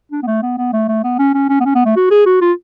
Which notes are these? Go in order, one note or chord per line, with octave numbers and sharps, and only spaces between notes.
D4
B3
A3
B3
B3
A3
A3
B3
C#4
C#4
C#4
B3
C#4
B3
A3
F#4
G#4
F#4
F4